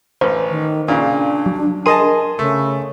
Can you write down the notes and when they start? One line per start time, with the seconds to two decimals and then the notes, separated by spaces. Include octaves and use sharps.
0.21 A1 B4 C5
0.50 D#3
0.88 A#2 C#3 D4
1.46 F#3
1.86 G#4 A#4 D#5 A5 C6 D#7
2.39 C#3 A3